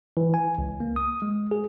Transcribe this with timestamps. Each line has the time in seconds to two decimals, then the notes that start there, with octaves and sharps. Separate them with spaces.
0.17 E3
0.34 G#5
0.58 C#2
0.80 A#3
0.96 D#6
1.22 G#3
1.51 G#4